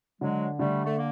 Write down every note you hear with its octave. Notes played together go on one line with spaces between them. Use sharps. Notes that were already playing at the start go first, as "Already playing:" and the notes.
D3 F#3 G#3
D3 G3 A3
A3
A#3